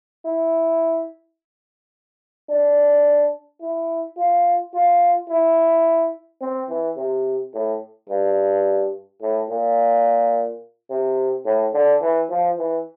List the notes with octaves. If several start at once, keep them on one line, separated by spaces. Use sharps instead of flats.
E4
D4
E4
F4
F4
E4
C4
E3
C3
A2
G2
A2
A#2
C3
A2
D3
E3
F3
E3